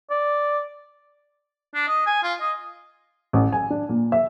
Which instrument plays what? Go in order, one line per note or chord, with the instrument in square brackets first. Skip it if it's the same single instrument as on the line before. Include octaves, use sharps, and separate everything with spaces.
[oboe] D5
[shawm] D4
D#5
G#5
F4
D#5
[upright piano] A1
G#5
D4
A#2
E5